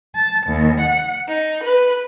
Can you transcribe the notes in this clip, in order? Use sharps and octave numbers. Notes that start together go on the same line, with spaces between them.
A5
D#2
F#5
D#4
B4